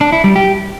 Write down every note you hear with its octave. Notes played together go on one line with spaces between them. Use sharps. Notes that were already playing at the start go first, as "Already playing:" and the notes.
D4
E4
G3
G4